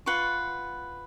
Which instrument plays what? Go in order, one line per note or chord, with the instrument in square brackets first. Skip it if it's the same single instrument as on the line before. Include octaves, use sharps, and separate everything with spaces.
[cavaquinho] F4 B4 F#5 C#6